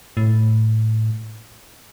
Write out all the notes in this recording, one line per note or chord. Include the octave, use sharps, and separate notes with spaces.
A2